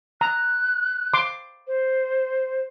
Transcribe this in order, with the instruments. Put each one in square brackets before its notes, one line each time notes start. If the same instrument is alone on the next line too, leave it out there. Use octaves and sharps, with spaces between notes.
[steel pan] A#5 [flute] F#6
[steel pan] C6 D6
[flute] C5